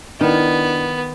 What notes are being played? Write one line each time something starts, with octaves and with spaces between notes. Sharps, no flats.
D#3 B3 D4 E4